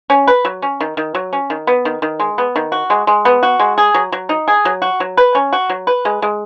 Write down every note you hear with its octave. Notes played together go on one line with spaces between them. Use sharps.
C#4
B4
F#3
C#4
D#3
D#3
F#3
C#4
D#3
B3
D#3
D#3
G#3
B3
D#3
F#4
G#3
G#3
B3
F#4
G#3
G#4
F#3
F#3
D#4
G#4
F#3
F#4
F#3
B4
C#4
F#4
F#3
B4
G#3
G#3